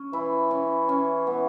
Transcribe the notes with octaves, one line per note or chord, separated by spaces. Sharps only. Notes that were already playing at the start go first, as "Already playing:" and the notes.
Already playing: C#4
E3 E4
C#4
C#4
B3